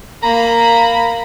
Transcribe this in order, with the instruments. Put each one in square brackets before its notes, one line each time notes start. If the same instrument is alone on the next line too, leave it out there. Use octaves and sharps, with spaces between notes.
[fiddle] A#3 B5 [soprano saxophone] A#5